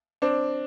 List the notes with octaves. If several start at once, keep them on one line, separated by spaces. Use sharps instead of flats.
C4 D4